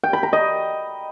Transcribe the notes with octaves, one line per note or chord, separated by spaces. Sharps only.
G5
B5
A#5
D#5